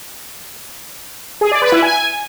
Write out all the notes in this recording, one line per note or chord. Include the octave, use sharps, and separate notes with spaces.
G#4
D5
B4
E4
G#5